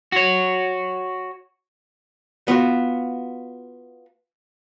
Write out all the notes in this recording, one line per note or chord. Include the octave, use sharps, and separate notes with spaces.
F#4 C#5
B3 F4 F#4